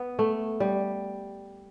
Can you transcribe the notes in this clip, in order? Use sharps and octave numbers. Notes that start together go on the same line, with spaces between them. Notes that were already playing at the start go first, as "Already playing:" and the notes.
Already playing: B3
A3
G3